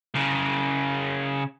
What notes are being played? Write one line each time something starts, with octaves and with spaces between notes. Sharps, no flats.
C#3 A#4